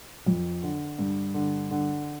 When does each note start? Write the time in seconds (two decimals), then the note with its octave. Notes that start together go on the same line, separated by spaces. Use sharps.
0.26 F2
0.63 D3
0.99 G2
1.34 D3
1.70 D3